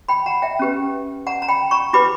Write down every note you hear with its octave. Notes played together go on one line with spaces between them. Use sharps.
G5 B5
F#5 A#5
E5 G5
C#4 G4 B4
F#5 A#5
A#5
G5 B5
A#5 C#6
E4 G4 B4 B5 D6